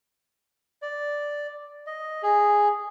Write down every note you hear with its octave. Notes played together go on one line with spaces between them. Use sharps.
D5
D#5
G#4